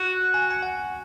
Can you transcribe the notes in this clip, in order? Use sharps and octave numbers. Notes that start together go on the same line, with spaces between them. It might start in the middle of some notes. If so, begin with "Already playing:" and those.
Already playing: F#4 F#5
G#5
G#5
F#5